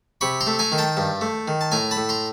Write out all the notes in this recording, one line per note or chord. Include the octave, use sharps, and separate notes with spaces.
C3 B5 C#6
A#5 C6
A3
G#5 A#5
D#3
G5 A5
G2
A3
D#3
A5
A2 G#5 A#5
A5 B5
A2
A#5 C6